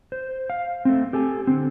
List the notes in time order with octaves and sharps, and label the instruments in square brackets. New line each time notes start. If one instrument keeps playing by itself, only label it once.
[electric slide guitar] C5
F5
A3 C4
G4 A4 G#5
D3 C4